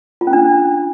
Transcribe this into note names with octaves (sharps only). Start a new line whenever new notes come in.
F4
C#4
D4